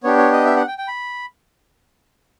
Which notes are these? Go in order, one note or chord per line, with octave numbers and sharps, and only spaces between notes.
B3 D4 G4 C#5
C#5
D#5
E5
F#5
G5
G5
B5